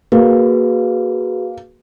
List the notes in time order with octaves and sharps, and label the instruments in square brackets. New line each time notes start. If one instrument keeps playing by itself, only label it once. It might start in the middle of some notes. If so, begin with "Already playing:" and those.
[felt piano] A#3 [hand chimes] F#4 G#4 B4